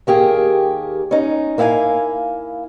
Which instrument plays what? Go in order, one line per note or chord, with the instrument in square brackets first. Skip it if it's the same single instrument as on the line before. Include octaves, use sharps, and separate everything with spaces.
[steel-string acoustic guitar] D#2 A#3 G4 G#4
C#4 D#4
A#3 E4 F5 F#5 G#5